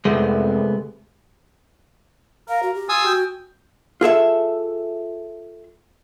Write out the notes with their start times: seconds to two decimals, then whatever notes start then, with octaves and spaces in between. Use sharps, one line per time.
0.05 C2 F2 G#3 A3 B3
2.49 A#4 F5
2.63 F#4
2.75 G4
2.89 F4 G#5 D#6 E6
3.06 F#4 G5
4.01 F4 G#4 A4 E5